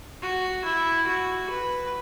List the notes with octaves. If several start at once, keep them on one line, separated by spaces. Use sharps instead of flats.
F#4
E4
F#4
B4